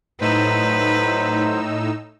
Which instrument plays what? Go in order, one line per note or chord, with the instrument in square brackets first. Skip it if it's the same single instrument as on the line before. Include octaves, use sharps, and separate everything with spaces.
[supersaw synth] A2 D#4 E6 [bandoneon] F#3 C5 [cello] B4